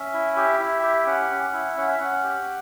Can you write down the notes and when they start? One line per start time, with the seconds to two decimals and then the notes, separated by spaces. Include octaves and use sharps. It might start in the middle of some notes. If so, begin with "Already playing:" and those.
Already playing: C#4 E5
0.14 E4
0.36 G4 E5
0.60 E4
0.83 G4
1.06 C#4 F#5
1.30 C#4
1.53 E4
1.77 C#4 F#5
1.88 E5
2.00 C#4 F#5
2.24 G4